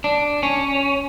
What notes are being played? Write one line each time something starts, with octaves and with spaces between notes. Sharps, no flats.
D4
C#4